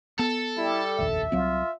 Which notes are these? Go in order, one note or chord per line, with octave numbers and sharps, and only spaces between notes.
B3 A4
G3 E4
F1 A#1 D#2 E5
C2 F#3 C4 F4